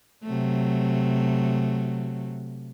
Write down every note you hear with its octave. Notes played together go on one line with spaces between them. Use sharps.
C3 F#3 A3